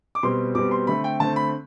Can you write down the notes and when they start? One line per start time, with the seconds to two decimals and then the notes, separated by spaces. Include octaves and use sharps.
0.15 D6
0.23 B2 G3 C4 C6
0.55 B2 G3 C4 D6
0.71 C6
0.87 D3 A3 C4 B5
1.04 G5
1.20 D3 A3 C4 A5
1.36 B5